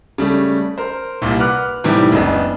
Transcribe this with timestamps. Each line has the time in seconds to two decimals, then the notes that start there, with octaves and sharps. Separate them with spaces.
0.18 C#3 G3 A3
0.78 A#4 C5
1.22 C2 A#2 G3
1.39 B4 F#5 D6 F6 F#6
1.84 A2 C3 D#3 E3 G3
2.12 F#1 C#2 B3 D4 D#5